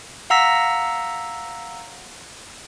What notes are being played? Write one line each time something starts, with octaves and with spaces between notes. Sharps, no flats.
F5 F#5 A#5 E6 A#6 B6